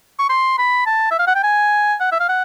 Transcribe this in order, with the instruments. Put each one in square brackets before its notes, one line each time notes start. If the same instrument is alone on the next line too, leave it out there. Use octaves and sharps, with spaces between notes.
[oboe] C#6
C6
B5
A5
E5
F5
F#5
G5
G#5
F#5
E5
F5
F#5